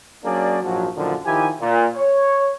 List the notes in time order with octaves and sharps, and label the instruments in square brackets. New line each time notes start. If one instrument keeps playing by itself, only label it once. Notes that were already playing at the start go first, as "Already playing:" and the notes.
[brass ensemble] F#3 A#3 C#4 D4 G#4 D5
A#1 G#2 F3 F#3
F#2 A#2 D3 D#3 F3
D#3 F3 E4 G4 G#5
A#2
C#5